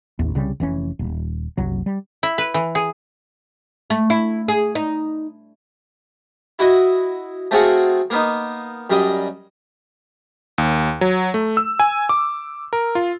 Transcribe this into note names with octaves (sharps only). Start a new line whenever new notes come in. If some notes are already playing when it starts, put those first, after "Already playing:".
A1 D#2
C2 C#3 G3
F1 E3 C#4
D#1
F#1 C2 F#3
G3
E4
B4
E3
G#4
A3
E4
G#4
D#4
E4 F#4 D#5
A3 C4 F4 F#4 G#4 F#5
A#3 B3 D#4
F#2 G3 D#5
D#2
F#3
A3
E6
G#5
D6
A#4
F4